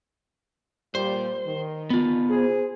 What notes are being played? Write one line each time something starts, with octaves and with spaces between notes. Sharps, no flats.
A#2 G3 C5
D#3
B3 F4
G#4 C5